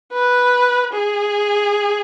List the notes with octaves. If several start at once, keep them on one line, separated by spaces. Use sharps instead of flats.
B4
G#4